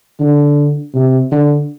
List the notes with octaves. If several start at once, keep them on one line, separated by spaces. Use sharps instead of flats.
D3
C3
D3